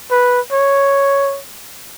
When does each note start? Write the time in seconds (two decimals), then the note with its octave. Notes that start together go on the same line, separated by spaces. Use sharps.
0.11 B4
0.52 C#5